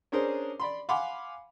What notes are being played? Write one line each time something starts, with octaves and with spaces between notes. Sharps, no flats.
C#4 D4 G#4 A#4 C5
D5 B5 C6
F5 F#5 G#5 B5 C6 D6